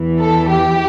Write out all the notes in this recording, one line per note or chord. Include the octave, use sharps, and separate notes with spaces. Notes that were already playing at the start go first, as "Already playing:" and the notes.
Already playing: E2 E3
A4
G4